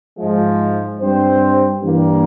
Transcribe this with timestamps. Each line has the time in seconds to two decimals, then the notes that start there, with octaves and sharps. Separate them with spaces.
0.17 G#2 F3 G#3
1.00 G2 G3 C4 C5
1.81 G2 E3 G3 A#3